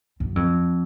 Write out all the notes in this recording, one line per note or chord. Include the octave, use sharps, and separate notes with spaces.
F#2
F2